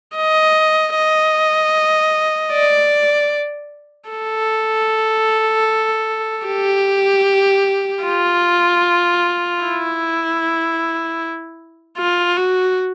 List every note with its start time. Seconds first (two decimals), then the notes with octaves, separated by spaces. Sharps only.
0.16 D#5
0.95 D#5
2.53 D5
4.10 A4
6.46 G4
8.04 F4
9.62 E4
11.97 F4
12.37 F#4